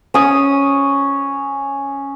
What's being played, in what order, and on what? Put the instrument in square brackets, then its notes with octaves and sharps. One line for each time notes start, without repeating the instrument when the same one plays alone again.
[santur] C#4 D#6